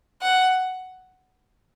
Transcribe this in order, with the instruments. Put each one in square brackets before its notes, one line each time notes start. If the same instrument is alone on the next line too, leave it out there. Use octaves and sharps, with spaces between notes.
[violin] F#5